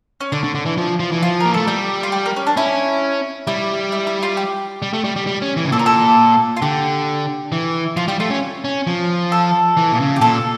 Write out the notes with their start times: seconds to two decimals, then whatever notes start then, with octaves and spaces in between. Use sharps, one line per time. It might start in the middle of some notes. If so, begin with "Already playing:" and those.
0.21 C#4
0.32 D3 D4
0.44 D3
0.55 D3
0.66 E3
0.77 F3
1.00 F3
1.12 E3
1.23 F3 F4
1.40 A#4
1.46 A#3
1.54 A3 A4
1.67 G3 G4
2.03 F4
2.12 G4
2.26 A#3
2.36 C#4
2.47 D4
2.57 C#4 E4
3.47 G3 E4
3.92 E4
4.07 E4
4.23 F4
4.37 G4
4.82 G3
4.93 A3
5.04 G3
5.16 G3
5.27 G3
5.42 C#4
5.57 E3
5.65 C#3
5.72 A#2 A4
5.79 A#4
5.86 A4
6.57 F4
6.62 D3 G4
7.52 E3
7.97 F3 F4
8.08 G3 G4
8.20 A3 F4
8.30 C#4
8.65 C#4
8.87 F3
9.32 A4
9.77 E3
9.92 A#2
10.00 C#3
10.16 G4
10.21 A#2 A4